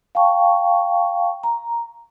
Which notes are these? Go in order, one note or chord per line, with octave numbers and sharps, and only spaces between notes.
F5 G5 A5 C#6
A#5